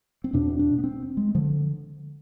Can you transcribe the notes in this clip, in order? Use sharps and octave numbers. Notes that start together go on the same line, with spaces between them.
C4
E2 B2 D4
D4
B3
C4
G#3
D3 F3